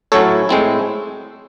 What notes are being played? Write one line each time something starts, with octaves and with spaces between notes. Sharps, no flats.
A2 F#3 C#4 E4 A4 C#5
A2 G#3 C4 E4